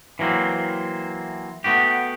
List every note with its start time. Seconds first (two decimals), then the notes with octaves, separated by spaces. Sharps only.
0.19 E3 F#3 A#3 C4
1.64 A3 B3 F#4 G4